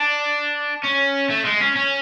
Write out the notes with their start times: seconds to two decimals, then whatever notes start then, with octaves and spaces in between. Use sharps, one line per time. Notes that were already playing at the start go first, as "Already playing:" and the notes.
Already playing: D4
0.83 C#4
1.30 A3
1.45 G#3
1.61 C#4
1.76 C#4